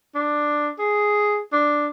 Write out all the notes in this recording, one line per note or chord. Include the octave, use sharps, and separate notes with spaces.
D4
G#4
D4